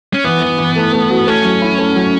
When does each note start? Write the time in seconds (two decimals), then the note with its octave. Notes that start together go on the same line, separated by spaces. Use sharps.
0.14 C#4
0.24 E3 B3
0.42 E3
0.58 E3
0.76 A3
0.93 A3
1.10 F#4
1.27 A3 C#4
1.45 F#3
1.62 E4
1.79 A3
1.96 F#3